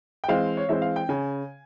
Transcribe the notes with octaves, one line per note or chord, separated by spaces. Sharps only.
G5
E3 G#3 C4 F5
C#5
E3 G#3 C4 E5
F5
G5
C#3 G#5